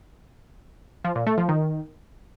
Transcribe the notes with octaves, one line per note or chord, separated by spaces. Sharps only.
F3
A#2
A3
F3
D#3